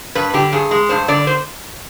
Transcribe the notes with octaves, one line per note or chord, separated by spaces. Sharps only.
G2 B4
D3 G4
G2 G#4
G#3
G2 C5
D3 D5
C5